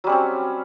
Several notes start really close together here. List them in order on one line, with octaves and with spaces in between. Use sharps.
F#3 G3 C#4 C4